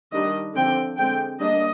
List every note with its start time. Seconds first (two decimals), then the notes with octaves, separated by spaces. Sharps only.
0.12 D#3 G3 D4 D#5
0.55 D3 F3 C4 G5
0.98 D3 G#3 C4 G5
1.40 G3 A#3 D4 D#5